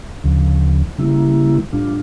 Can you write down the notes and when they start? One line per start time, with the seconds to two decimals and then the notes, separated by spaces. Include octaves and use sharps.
0.24 D2 C#3 F3
0.98 C#3 G3 A#3 E4
1.73 A2 G3 D4 F4